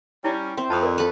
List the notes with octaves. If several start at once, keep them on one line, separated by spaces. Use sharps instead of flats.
G3 C#4 E4
C4 C5 E5 G5
F2 A5 B5 D#6
A#4 D5
A4 B4